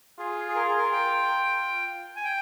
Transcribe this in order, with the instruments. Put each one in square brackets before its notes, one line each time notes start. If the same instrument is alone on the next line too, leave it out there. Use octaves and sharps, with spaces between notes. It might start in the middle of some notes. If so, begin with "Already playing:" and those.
[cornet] F4 [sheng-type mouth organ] G#4
[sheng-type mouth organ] G#4
A#4
G#4
A#4
G5
G#5
G5